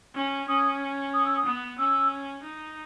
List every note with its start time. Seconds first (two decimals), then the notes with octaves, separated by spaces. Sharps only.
0.15 C#4
0.48 C#4 D#6
1.14 D#6
1.25 E6
1.37 D#6
1.46 B3
1.78 C#4 E6
2.44 D#4